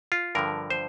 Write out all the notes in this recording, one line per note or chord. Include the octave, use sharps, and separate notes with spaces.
F4
G2 D3 F3 A#4
C5